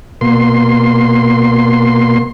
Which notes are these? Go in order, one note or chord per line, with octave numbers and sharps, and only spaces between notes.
B2 A#3 C6